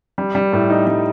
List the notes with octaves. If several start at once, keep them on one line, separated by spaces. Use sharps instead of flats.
G3
G3
A2
D#4
G3